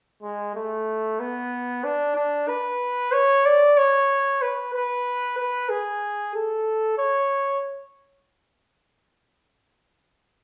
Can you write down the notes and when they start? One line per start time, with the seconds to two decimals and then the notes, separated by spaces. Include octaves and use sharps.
0.23 G#3
0.55 A3
1.20 B3
1.84 D4
2.16 D4
2.48 B4
3.12 C#5
3.45 D5
3.77 C#5
4.42 B4
4.74 B4
5.38 B4
5.69 G#4
6.35 A4
6.98 C#5